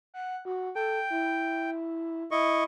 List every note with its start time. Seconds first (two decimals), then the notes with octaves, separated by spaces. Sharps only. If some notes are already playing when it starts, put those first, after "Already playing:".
0.14 F#5
0.45 F#4
0.75 A4 G5
1.10 E4
2.31 E4 D#5 C#6